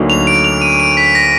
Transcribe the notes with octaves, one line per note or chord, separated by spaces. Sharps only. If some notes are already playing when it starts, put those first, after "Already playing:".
Already playing: D2 D3 F#3 A#3 D#4
F7
D7
F7
D#7
D7
B6
A#6